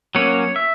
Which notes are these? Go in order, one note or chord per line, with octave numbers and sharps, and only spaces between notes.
F#3 A#3 C#4 C#5
E5